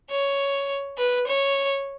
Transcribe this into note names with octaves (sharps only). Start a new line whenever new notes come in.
C#5
B4
C#5